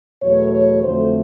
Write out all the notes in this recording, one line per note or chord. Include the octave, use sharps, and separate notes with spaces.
E2 B2 F#3 A3 C#5
C#5
F2 D3 F#3 A3 C5